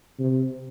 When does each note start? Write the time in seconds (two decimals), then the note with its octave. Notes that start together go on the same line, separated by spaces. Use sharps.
0.19 C3